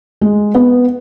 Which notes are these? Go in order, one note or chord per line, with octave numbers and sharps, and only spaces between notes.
G#3
B3